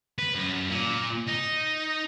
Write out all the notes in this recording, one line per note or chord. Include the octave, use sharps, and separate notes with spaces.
B4
F#2
A#2
D#4